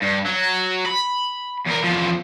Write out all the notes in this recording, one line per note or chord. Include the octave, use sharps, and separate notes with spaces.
G2
F#3
B5
E2 A#4
E2 F3